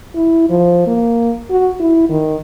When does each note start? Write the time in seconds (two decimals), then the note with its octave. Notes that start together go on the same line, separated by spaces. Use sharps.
0.15 E4
0.50 F3
0.87 A#3
1.50 F#4
1.80 E4
2.10 D#3